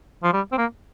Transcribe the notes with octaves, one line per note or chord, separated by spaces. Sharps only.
F3
G3
C4
A#3